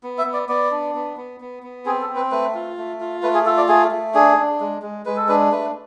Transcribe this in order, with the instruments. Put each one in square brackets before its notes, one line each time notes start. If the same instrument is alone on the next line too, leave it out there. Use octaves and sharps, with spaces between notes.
[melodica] B3
E5
B3
D5
B3 D5
D4
B3
B3
B3
B3
C4 G#4
A4
C4
B4
A3 B4
F4
A3
F4
A3 B4
G#4
F4 A4
D5
A3 G#4
A3
D4 G#4
D4
G#3
G#3
G#3 B4
A4
D4 B4
A3 B4